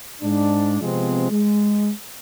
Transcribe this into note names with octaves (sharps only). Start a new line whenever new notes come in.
G#2 D4
C3 F3 G#3 B3 C4
G#3